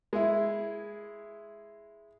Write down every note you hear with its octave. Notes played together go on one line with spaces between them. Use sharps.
G#3 E4